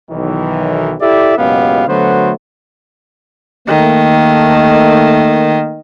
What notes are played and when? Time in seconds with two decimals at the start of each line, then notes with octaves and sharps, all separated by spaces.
0.10 B1 D#3 E3
1.01 E4 G4 A4 D5 E5
1.38 F#1 C#2 B2 B3 G4 F5
1.87 D3 F#3 A3 B3 F#4 C5
3.68 D#3 A3 A#3